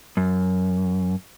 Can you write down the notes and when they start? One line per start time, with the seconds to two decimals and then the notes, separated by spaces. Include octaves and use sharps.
0.17 F#2